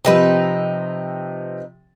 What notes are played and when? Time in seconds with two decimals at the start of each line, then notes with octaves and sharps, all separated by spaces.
0.05 C3 F3 C4 D#4 B4